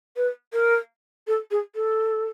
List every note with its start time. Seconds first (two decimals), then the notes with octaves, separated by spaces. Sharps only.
0.16 B4
0.53 A#4
1.27 A4
1.51 G#4
1.75 A4